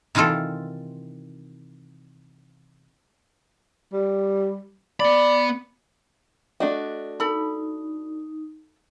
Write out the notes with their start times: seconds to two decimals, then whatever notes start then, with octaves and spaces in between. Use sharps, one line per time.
0.15 C3 D#3 E3 F4 A4
3.93 G3
5.00 B3 D5 B5
6.60 A3 D4 F#4 D#5
7.20 D#4 A4 B5